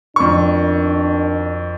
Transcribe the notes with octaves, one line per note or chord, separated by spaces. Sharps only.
F2 B2 D#3 D4 C#6